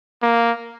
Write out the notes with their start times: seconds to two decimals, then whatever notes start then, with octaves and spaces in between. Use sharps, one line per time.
0.23 A#3